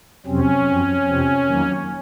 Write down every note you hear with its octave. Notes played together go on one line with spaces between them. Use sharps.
F2 C3 F#3 C4 C#4
F#2 F3 C4
F2 C3 F3 C4
F2 D#3 F#3 A#3